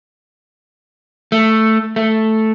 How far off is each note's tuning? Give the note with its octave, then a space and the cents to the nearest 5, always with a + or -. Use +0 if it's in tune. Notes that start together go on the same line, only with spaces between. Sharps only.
A3 +5
A3 +0